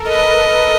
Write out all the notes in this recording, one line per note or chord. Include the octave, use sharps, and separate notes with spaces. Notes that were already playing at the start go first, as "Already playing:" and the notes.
Already playing: A4 A#4
B4 D#5